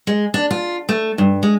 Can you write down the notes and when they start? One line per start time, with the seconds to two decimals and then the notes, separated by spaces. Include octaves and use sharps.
0.07 G#3
0.34 D4
0.51 F4
0.89 A3
1.18 G2
1.43 G#3